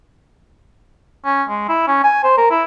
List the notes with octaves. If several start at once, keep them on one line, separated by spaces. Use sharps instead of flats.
C#4
G#3
E4
C#4
G#5
C5
A#4
E4